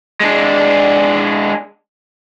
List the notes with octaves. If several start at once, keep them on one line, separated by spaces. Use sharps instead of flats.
G#3 D4